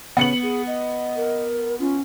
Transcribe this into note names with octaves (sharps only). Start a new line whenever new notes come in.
C#3 B3 C#7 F#7
G#4
D#5
A#4
C#4 F4